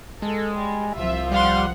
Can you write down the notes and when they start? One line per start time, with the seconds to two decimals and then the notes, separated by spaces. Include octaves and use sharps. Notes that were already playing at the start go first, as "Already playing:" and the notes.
0.22 G#3 A4
0.54 G3
0.95 C2 F3 F4 E5
1.32 G3 F5 F#5 C6